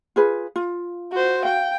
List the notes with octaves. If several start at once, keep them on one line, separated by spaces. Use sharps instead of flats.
F4 G#4 B4
F4
F#4 C5
F5 G5